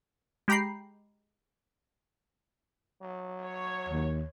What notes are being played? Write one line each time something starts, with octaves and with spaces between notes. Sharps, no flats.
G#3 G4 G5 A#5 B5 C7
F#3
C#5
D#2